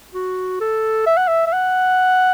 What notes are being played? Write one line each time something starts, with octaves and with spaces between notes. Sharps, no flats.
F#4
A4
E5
F#5
E5
E5
F#5